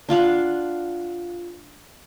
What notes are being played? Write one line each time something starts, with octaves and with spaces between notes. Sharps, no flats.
D4 F4 F5 F#5